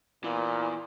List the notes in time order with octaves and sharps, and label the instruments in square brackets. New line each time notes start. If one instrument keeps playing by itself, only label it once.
[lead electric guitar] E2 E3 [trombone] A#2